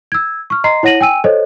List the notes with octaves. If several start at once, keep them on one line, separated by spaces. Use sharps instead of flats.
E6 G#6
C#6 F6
D#5 A#5 C6 C7
E4 C#5 F#5 A#6 D#7 F#7
G5 G#5 E6 D#7
A4 C5 C#5 D#5